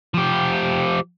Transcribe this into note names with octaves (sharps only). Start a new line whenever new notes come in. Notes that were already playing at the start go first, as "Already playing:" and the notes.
F3 G4